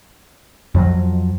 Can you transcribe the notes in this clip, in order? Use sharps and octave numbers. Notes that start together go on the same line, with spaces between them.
F2 F3 F#3